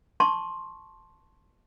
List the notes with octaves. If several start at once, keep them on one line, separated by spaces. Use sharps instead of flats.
A5 C6 C#6